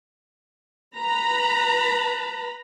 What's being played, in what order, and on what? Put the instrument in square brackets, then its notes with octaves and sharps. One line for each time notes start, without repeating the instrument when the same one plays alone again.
[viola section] B4 A#5 B5